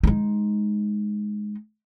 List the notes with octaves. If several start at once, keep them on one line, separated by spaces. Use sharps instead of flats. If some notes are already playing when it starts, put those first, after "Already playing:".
G#3 D#4